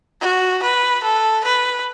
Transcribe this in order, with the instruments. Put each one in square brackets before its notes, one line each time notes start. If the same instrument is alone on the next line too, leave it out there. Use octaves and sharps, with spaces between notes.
[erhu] F#4
B4
A4
B4